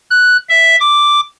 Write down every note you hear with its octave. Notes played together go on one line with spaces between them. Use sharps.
F#6
E5
D6